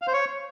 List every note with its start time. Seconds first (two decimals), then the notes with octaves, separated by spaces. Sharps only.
0.02 F5
0.07 C5
0.13 C#5